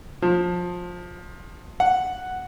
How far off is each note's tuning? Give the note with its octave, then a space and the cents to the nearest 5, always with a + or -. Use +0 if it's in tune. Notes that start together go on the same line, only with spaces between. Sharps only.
F3 +20
F#5 +0